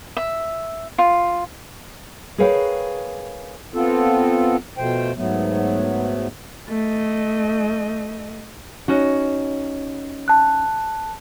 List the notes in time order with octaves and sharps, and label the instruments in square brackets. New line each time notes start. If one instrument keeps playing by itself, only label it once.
[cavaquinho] E5
F4
[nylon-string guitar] G#4 A#4 B4 C#5 F5 G5
[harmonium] B3 C4 F4 A4
B2 F3 A3 C5 G5
G#2 F#3 A3 B3
[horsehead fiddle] A3 D#5
[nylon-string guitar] C#4 D#4 F#4
[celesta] A5 F#6